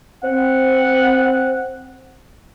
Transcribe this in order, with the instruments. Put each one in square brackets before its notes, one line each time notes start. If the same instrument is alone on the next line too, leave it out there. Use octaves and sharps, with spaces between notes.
[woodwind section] C4 F#5